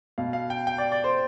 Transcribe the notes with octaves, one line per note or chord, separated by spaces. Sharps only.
B2 F5
F5
G5
G5
D5
D5
C5